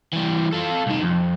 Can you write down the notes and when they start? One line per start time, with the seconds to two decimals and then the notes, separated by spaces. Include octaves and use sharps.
0.13 E3 G3
0.53 F4 A4
0.86 C2 D#3
1.02 F2